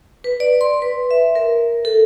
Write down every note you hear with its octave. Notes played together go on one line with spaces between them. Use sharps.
B4
D5
C6
B4
E5
A#4
A4